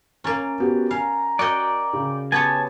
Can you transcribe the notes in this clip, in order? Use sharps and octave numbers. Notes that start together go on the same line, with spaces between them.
A#3 C#4 A#5 A6 D7
B3 F#4 G4
F5 G#5 A#5
F#4 A#4 D5 D#5 G5
C#3
B3 G4 C#5 G#5 A5